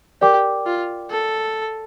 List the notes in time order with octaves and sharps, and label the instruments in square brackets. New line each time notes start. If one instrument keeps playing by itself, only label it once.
[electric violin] G4 [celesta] A#4 D5 G5 D6
[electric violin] F4
A4